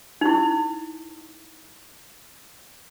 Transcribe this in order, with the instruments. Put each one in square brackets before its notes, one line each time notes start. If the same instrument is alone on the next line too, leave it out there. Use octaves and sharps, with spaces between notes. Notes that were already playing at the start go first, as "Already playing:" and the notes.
[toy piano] D#4 E4